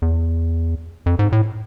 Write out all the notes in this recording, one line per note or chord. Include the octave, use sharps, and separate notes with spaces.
E2
F2
G#2
A2